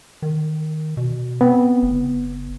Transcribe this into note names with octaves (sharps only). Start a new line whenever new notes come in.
D#3
B2
B3 C4
F#1